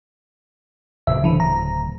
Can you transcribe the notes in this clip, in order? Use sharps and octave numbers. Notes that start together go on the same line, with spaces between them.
D1 C#3 E5
D3 E3
A#5